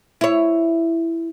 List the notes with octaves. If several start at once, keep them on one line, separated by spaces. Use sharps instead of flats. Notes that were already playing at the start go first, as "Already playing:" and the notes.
E4 C#5